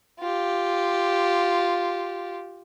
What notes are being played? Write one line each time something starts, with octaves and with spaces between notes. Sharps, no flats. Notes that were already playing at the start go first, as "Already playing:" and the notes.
F4 G4